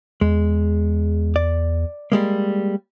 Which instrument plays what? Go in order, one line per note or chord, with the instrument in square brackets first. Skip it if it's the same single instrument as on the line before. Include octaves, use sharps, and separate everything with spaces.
[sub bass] E2 [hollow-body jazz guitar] G#3
[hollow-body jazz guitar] D5
G3 G#3 A#3